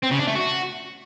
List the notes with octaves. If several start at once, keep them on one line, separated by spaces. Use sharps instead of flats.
C4
C#3
D4
A3
F#4